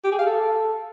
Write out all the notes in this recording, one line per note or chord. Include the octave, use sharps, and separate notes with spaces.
G4
G#4
F5
A4